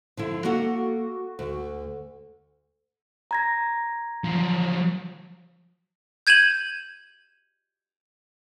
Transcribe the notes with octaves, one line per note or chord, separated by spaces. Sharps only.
D3 F3 E4
A#3 F#4 A4 F#5
D2
A#5 G#6 A#6
F3 F#3
G6 G#6 D#7 E7 F#7